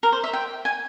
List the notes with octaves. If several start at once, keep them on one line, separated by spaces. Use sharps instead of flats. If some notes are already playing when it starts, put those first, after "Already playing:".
A#4
C5
E5
G5
G#5